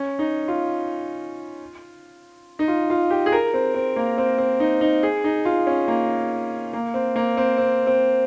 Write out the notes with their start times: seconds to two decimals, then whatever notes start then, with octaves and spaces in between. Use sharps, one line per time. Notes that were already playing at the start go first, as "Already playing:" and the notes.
Already playing: C#4
0.19 D#4
0.48 F4
2.59 D#4
2.68 F4
2.90 F4
3.10 G4
3.26 G#4
3.32 A#4
3.54 C4
3.74 C4
3.96 A#3
4.18 C4
4.38 C4
4.60 D#4
4.81 D#4
5.03 G#4
5.24 D#4
5.45 F4
5.67 C#4
5.88 A#3
6.73 A#3
6.94 C4
7.16 A#3
7.37 C4
7.58 C4
7.87 C4